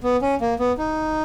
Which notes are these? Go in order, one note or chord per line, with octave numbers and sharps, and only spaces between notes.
B3
C#4
A#3
B3
D#4